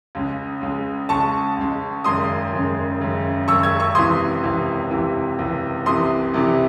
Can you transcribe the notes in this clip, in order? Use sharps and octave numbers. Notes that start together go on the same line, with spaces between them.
C#2 C#3 G#3
C#2 C#3 G#3
C#2 C#3 G#3 A5 C#6
C#2 C#3 G#3
G#1 F#2 C#3 G#3 C6 D#6
G#1 F#2 C#3 G#3
G#1 F#2 C#3 G#3
G#1 F#2 C#3 G#3 C#6 E6
E6 G#6
C#6 E6
C#2 C3 E3 C6 D#6
C#2 C3 E3
C#2 C3 E3
C#2 C3 E3
C2 C3 E3 C6 D#6
C2 C3 E3